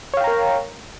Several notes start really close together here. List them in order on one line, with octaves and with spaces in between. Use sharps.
C#5 F5 G5 A#5 A#4